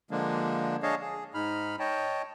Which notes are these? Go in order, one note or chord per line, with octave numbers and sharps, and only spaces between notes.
D3 F3 G#3 A#3 D4
D4 G#4 C#5 D#5 F5 A5
G#4
G#2 D#4 B5 F6
C#5 D#5 G5 A5